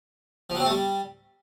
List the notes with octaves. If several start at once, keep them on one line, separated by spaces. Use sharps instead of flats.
F3
F#3
C4
A3
G3